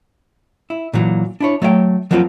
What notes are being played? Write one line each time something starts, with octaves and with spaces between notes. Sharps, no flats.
E4
A#2 E3 F#3
D4 E4 C#5
F#3 A3 C#5 E5 G5
F3 F#3 A#3 C4 E4 F4